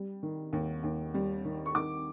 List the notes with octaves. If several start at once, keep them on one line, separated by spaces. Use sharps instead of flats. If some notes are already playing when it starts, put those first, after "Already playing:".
Already playing: G3
D#3
D#2
D#2
G3
D#3
C#6
D#3 D6